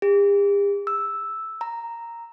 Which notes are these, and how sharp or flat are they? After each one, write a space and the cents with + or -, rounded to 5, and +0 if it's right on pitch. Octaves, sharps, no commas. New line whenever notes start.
G4 +45
E6 -5
A#5 -5